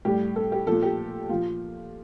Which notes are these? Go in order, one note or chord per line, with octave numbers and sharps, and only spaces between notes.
A2 G3 G4
A4
G4
A#2 F3 A4
G4
A#2 F3 F4